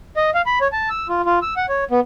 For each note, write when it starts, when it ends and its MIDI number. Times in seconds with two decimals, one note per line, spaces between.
0.17 0.30 75
0.34 0.42 77
0.46 0.59 83
0.61 0.68 73
0.72 0.89 81
0.90 1.07 88
1.09 1.22 65
1.26 1.39 65
1.42 1.54 88
1.56 1.66 78
1.69 1.84 73
1.91 2.00 59